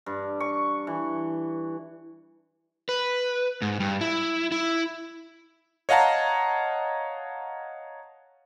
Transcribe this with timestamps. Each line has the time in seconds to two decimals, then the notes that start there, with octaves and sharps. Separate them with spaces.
0.06 G2
0.40 C#6
0.87 E3
2.89 B4
3.62 G#2
3.80 G2
4.01 E4
4.52 E4
5.89 C#5 D#5 F5 F#5 A5 A#5